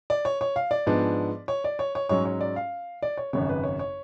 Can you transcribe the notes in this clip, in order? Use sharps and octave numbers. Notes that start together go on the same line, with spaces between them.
D5
C#5
C#5
F5
D5
G#2 F3 B3 D4
C#5
D5
C#5
C#5
G#2 F#3 C#4 C#5
C#5
D5
F5
D5
C#5
G#1 F#2 C#3 C#5
B4
C#5
C#5